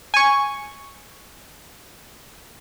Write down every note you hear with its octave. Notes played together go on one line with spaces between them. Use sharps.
G#5 C#6